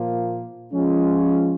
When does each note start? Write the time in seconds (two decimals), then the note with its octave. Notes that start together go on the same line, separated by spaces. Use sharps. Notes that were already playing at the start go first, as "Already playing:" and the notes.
Already playing: A#2 F3 A#3 F4
0.72 F3 G#3 C#4 F4